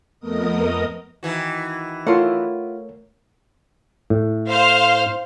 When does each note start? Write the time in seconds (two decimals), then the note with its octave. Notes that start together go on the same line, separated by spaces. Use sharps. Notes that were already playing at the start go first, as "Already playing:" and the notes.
0.20 F2 A3 B3 A#4 D#5 D#6
1.23 D#3 E3 F#4
2.07 A3 E4 F4 A#4 C#5 F#5
4.10 A2
4.50 C5 F5